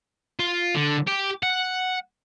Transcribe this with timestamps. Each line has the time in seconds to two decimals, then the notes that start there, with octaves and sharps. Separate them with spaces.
0.39 F4
0.75 D3
1.08 G4
1.43 F#5